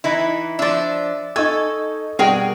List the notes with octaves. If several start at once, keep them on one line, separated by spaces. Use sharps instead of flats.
E3 D#4 E4
F3 D4 D5 E5
D#4 A4 G#5 C#6 G#6
B2 G3 F#4 G#4 A#4 G5